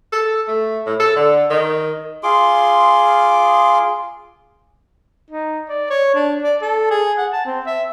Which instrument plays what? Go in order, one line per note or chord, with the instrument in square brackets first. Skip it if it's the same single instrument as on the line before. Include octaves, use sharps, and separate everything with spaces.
[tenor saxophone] A4
A3
A2
A4
D3
D#3
[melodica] F4 G#4 C6 D6
[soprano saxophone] D#4
D5
C#5
D4
D5
A4
G#4
F#5
A5
C4
E5